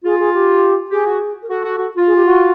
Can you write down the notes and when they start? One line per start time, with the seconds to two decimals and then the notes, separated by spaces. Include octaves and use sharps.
0.04 F4 G#4
0.19 G#4
0.33 G4
0.91 G4 G#4
1.05 F#4
1.42 A#4
1.49 F#4 A4
1.63 F#4
1.78 F#4
1.97 F4
2.06 G#4
2.16 G4
2.25 F#4